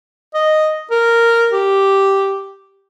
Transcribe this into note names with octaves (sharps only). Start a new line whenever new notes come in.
D#5
A#4
G4